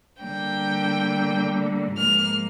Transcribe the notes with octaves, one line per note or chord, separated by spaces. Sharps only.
D3 G3 A#3 G5
G#2 F3 A#3 F6